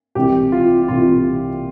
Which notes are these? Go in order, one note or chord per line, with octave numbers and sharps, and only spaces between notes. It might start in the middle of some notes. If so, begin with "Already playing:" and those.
C2 C3 E3 G4
F4
C2 C3 E3 F4